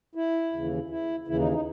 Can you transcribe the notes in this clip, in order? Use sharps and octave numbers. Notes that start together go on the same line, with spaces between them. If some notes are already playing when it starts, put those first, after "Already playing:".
E4
D#2 C#3 E3
E4
D#2 C#3 E3 E4
D#4
D#4